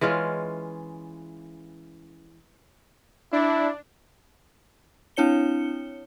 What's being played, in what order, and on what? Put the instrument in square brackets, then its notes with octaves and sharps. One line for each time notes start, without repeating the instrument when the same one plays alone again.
[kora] E3 G#3 C#4 F4
[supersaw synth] D4 [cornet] E4
[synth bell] C4 D4 E4 C#5 C#7 G7